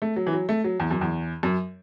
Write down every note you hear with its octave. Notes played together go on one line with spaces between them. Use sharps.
A3
F#3
E3
F#3
A3
F#3
E2
F#2
E2
F#2